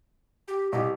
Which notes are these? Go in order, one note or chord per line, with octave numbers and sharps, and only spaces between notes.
G4
C2 G4 D#5